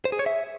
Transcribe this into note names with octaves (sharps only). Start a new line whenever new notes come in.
C5
G#4
C#5
E5